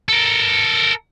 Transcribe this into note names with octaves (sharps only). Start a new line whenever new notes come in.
A4 A#4